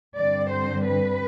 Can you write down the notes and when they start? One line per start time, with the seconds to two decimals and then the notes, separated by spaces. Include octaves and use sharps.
0.15 G2 D3 G3 C4 D5
0.50 C5
0.85 B4